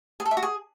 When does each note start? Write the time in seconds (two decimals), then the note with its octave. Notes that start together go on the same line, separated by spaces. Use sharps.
0.20 G#4
0.25 A4
0.31 E5
0.37 F#4
0.43 G#4